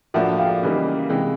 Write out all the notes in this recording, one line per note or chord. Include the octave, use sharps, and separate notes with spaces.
A2 F3 A#3 D4 F#4 E5 F#5
F5 G5
C#3 E3 G3 A#3 D#4
C3 E3 G#3